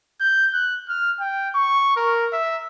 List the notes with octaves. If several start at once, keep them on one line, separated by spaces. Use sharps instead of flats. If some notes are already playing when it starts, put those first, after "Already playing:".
G6
F#6
F6
G5
C#6
A#4
E5